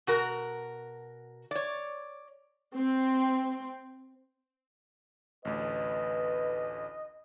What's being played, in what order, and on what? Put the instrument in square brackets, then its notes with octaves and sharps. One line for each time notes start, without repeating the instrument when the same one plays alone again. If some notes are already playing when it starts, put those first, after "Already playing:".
[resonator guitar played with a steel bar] B2 F#4 A#4
C#5 D5
[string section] C4
[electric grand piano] A1 D2 [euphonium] B4 [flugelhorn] D#5